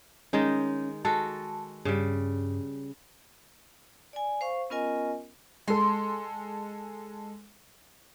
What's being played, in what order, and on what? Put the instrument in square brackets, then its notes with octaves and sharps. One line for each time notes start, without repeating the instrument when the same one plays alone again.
[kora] D#3 G#3 D#4 [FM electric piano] C#4
[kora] G#3 F#4 A4 [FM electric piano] A5
[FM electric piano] G2 [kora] C#3 G3
[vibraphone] D5 G#5
C5 F5 C#6
B3 C#4 F4 A#4 D#5 G#5
[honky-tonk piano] G#3 A4 [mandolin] C6